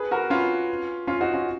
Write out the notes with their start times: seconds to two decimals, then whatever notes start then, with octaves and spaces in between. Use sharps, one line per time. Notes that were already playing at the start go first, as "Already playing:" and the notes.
Already playing: G#4 B4
0.11 F#4 A#4
0.30 C#4 F4
1.07 C#4 F4
1.21 D#4 F#4
1.34 C#4 F4